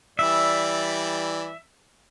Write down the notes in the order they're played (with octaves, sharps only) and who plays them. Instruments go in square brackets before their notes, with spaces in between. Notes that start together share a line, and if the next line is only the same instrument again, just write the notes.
[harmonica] E3 G3 D5 [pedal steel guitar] E5